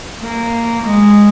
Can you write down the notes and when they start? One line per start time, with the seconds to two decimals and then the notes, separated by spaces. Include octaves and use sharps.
0.23 A#3
0.83 G#3